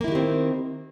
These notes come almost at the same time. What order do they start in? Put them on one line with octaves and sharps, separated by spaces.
A#3 E4 D#3 G4 C4